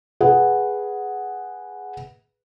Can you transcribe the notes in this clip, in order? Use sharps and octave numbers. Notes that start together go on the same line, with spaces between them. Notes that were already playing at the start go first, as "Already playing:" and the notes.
G#4 B4 F#5